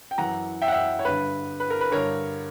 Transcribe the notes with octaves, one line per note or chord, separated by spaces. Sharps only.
G5
F#2 E3 F#5 A#5
E5 G5
F#5
E5 G5
C#5
G2 D3 B4
B4
A#4
B4
G2 D3 A#4 C#5